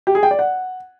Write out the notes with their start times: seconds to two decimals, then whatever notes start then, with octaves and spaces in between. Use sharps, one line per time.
0.07 G4
0.15 G#4
0.23 G5
0.31 D5
0.39 F#5